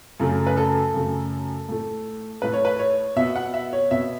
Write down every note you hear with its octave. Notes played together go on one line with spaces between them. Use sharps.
F#2 C#3 A3
B4
A4
F#2 C#3 A3
A2 A3
A2 A3 B4
C#5
B4
C#5
B2 B3 E5
F#5
E5
C#5
B2 B3 E5